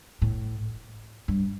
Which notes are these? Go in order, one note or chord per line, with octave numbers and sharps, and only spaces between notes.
A2
G2